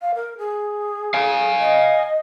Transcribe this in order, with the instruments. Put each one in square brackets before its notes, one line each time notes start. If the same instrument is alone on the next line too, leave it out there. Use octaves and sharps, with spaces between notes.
[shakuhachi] F5
A#4
G#4
[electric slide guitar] F5 G#5
[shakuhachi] D#5